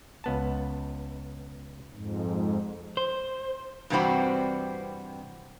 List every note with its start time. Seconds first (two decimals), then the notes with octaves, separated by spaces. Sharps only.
0.24 C#2 B3 A5
1.93 F2 G#2
2.97 C5
3.90 G2 C3 E3 G3 C4 F#4